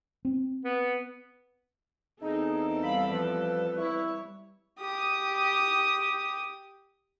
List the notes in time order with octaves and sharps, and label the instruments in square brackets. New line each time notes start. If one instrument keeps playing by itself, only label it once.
[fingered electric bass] C4
[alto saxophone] B3
[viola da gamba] E2 C4 A4 [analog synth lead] D#4 [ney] G#4
[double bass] G3 [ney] F5 [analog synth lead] B5
[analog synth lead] F3 [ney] B4
[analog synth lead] E4 [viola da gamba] C#5
[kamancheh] G4 D#6